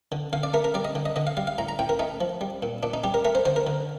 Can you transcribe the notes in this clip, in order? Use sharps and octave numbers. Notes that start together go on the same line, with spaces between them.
D3
D3 F5
D5
A3 A#4
A#4
G3 D5
D#5
D3
D#5
D3 D#5
F5
G3 F5
F5
A2 A#5
A#5
A2 G5
A#4
A3 D#4
F3
G3
A#2
A#2 D4
D#4
G3 G4
A#4
A3 A#4
C5
D3 C5
A#4
D3